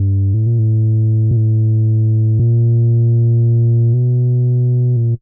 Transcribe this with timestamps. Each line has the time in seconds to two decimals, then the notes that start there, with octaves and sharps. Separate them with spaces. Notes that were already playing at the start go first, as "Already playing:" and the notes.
Already playing: G2
0.34 A2
0.46 A#2
0.59 A2
1.31 A#2
1.37 A2
2.39 A#2
3.94 B2
4.96 A#2